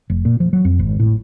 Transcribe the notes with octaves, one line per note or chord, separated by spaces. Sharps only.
F1
A#2
F3
F#3
F2
G#1
A2